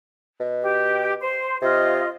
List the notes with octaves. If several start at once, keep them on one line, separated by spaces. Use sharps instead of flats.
B2
G4
C5
C3 F4 D#5